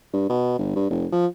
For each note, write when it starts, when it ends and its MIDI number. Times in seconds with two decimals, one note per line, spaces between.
0.13 0.25 43
0.29 0.58 47
0.59 0.73 31
0.76 0.89 43
0.90 1.06 29
1.12 1.26 53